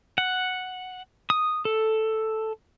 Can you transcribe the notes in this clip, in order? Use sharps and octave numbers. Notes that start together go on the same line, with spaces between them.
F#5
D#6
A4